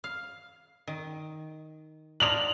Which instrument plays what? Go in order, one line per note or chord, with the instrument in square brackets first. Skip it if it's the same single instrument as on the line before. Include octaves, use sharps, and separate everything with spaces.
[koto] F5
D#3
[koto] D4 D#4 F4 [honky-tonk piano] F7 F#7